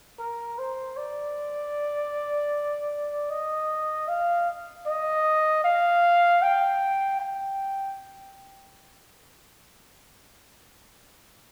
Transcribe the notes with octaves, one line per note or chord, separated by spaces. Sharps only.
A#4
C5
D5
D#5
F5
D#5
F5
G5
G5